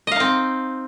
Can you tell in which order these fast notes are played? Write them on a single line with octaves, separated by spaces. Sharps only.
D#5 F5 D#4 C4